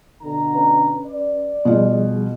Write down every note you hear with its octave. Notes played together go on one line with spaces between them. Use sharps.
B2 D3 A#5
C#4 B4
D5
B2 F3 G3 F4 G#4